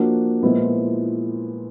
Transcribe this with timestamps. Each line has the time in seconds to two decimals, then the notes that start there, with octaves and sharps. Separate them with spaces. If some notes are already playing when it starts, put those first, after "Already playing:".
Already playing: F3 A#3 D4 F#4
0.43 A#2 F3 G#3 B3 E4